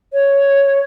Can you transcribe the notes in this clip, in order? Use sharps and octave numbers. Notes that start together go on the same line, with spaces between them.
C#5